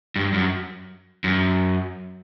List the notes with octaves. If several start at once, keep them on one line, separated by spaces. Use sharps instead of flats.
G2
F#2
F#2